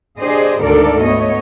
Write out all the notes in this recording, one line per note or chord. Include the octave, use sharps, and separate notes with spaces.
D4 G4 G#4 C5 D#5
D2 G#2 D#3 A4 A#4 D5
A3 B3 C#5 D#5